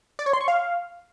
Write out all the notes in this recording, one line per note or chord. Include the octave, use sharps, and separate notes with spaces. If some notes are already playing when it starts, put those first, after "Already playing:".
D5
C#5
C6
C#6
F5